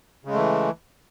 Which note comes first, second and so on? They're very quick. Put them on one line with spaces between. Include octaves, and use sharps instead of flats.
C#3 G#3 A3 E3